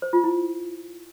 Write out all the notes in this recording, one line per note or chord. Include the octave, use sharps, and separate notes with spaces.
C5
F4
E4